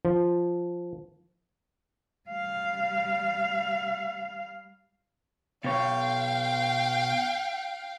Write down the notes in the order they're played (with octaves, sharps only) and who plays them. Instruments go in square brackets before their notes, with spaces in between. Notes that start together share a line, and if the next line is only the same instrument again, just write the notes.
[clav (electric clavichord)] F3
[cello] G3 F5
[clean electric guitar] B2 C#5 [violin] F5 G5